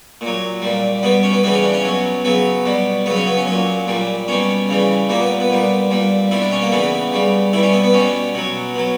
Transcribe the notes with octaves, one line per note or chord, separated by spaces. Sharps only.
A#2
F#3
A#2 G3
B2 G3 B3
C#4
B3
C#3 E3 G3 B3
C#4
D4
C#4
B2 F#3
C#3 F#3 B3
B2 G3
C#3 F#3 B3
C#4
B3
C#4
A#2 F#3
A#2 G3
B2 G3 C#4
C#3 E3 G3
A#2 G3 A#3
B3
B3
A#2 G3
A#2 G3
B2 G3 E4
D4
C#4
A#3
C#3 E3 G3 B3
C#3 G3
B2 G3 E4
C#4
B3
B3
B2 G3 C#4
B2 F#3
B2 F#3